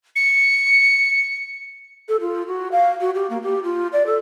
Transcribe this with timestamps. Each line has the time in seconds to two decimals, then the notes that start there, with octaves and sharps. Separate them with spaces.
0.16 C#7
2.09 A4
2.21 F4
2.47 F#4
2.72 F5
3.01 F#4
3.15 G4
3.30 A#3
3.43 G4
3.63 F4
3.93 D5
4.06 A4